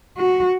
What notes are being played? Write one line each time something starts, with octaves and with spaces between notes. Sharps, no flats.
F#4